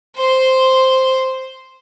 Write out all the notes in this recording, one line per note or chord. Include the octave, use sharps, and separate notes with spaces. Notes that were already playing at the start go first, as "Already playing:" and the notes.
C5 C6